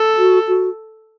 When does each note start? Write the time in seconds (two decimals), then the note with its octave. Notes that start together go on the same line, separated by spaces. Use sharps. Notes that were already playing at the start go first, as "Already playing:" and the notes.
Already playing: A4
0.18 F#4
0.48 F#4